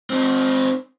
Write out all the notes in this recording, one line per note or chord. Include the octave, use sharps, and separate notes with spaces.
C4 D#4